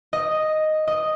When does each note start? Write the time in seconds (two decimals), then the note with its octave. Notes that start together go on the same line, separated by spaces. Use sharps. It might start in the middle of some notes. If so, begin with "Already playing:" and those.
0.13 D#5
0.87 D#5